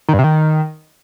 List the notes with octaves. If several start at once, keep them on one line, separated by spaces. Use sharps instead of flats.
D#3
G2
C3
D#3